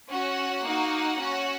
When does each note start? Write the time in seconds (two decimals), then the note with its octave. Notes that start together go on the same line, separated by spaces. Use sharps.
0.11 C#4 F#4 F#5
0.65 A#3 D#4 F#4
1.19 C#4 F#4